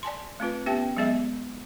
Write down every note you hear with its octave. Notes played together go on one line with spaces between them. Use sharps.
D5 G#5 A5 C6
A3 C4 F4 B4
B3 C#4 G4 B4 E5 G5
F#3 G#3 B3 G#4 D#5 E5